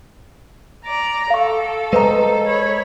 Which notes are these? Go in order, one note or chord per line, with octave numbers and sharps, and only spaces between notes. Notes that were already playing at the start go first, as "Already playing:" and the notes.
D5 A#5
A4 F5 C#6
G#3 B4 C5 D#5 G#5 A#5
C#5 B5